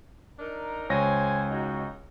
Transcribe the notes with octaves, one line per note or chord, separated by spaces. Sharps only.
D4 D#4 A#4
C#2 C5 C#5 G#5 A#6
D#4 F#4